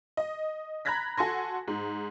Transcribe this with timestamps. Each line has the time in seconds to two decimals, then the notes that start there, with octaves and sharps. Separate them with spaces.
0.17 D#5
0.85 A#5 B5 F#6 G#6 A#6 B6
1.18 F#4 A4 G#5 C6 A#6
1.68 G#2